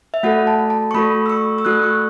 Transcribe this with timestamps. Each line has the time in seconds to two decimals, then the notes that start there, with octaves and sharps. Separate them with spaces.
0.14 E5
0.23 A3 F#4 A4 F#5
0.47 A5
0.70 A5
0.91 C#6
0.94 A3 F#4 A4 B5
1.26 E6
1.30 C#6
1.58 E6
1.65 A3 F#4 A4 F#6
1.83 C#6